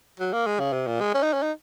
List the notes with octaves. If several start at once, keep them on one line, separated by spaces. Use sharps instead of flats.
F#3
A#3
G#3
C#3
C3
A#2
G#3
C#4
D#4
C#4
D#4